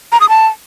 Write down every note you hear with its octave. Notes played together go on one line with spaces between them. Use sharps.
A#5
D#6
A5